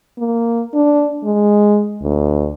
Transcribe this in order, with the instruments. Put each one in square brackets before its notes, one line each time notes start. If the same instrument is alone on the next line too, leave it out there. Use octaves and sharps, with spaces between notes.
[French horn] A#3
D4
G#3
D2